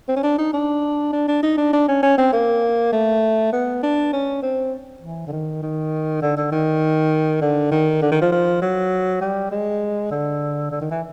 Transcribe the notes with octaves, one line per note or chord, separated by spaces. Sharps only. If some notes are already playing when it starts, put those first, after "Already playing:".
C4
C#4
D4
D#4
D4
D4
D4
D#4
D4
D4
C#4
C#4
C4
A#3
A3
B3
D4
C#4
C4
E3
D3
D#3
D#3
D3
D3
D#3
D3
D#3
D3
D#3
F3
F3
F#3
G3
G#3
D3
D3
D#3
E3